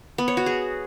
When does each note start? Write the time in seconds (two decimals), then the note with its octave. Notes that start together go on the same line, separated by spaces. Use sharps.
0.18 B3
0.28 C#5
0.37 F#4
0.46 G#4